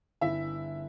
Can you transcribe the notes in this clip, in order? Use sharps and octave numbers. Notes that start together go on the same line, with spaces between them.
G1 E4 E5